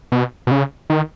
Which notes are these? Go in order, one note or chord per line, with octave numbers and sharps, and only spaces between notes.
B2
B2
C#3
D#3